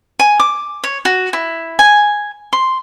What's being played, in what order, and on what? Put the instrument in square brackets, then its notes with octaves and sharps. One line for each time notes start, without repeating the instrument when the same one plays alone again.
[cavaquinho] G#5
D6
C#5
F#4
E4
G#5
C6